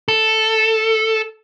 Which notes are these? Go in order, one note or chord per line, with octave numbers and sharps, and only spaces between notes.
A4